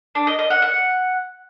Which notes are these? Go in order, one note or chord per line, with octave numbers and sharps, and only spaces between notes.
D4
D#5
D#5
F#5
F#5